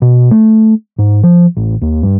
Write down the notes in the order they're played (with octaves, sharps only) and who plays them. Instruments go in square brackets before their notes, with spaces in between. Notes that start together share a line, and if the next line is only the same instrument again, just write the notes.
[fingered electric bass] B2
A3
G#2
F3
A1
D#2
G2